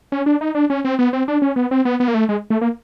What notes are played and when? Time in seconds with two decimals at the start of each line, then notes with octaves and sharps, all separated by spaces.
0.12 C#4
0.26 D4
0.41 D#4
0.55 D4
0.70 C#4
0.85 C4
0.99 B3
1.13 C4
1.28 D4
1.42 C#4
1.56 B3
1.71 C4
1.85 B3
2.00 B3
2.08 A#3
2.14 A3
2.29 G#3
2.50 A3
2.61 A#3